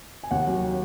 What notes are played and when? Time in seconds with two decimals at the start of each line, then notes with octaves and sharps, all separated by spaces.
0.23 G#5
0.31 D#2 F#5
0.47 F#3